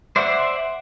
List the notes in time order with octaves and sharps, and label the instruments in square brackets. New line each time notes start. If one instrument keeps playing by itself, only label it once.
[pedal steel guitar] C5 D5 E5 F#5